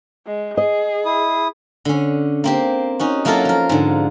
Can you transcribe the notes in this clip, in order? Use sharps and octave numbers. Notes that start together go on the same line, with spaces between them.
G#3
G#4 D#5
E4 D#6
D3 C#4
A#3 C4 G4
C#4 D#4 F#4
F#3 A#3 E4 F4 A4 A#4
F3 A#4
G#2 D3